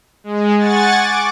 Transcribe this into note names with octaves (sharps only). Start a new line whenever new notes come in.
G#3
F#5 G#5 C#6 A6
D6